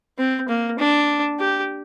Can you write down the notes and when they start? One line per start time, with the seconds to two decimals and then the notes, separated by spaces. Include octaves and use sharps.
0.18 C4
0.48 A#3
0.79 D4
1.40 G4